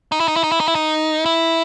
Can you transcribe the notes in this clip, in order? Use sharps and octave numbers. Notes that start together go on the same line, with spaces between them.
D#4
E4
D#4
E4
D#4
E4
D#4
E4
D#4
E4